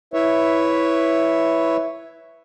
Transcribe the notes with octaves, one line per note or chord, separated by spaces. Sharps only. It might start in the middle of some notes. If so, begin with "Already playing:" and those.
E4 B4 C#5 E5